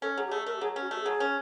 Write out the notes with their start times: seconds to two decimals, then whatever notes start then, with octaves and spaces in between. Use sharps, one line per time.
0.02 C#4 A4
0.17 F#3 G#4
0.26 G4
0.31 A3 G#4
0.46 A3 A#4
0.56 G4
0.61 F#3 G#4
0.76 C#4
0.81 F#4
0.91 A3 G4
1.01 F#3 G#4
1.20 C#4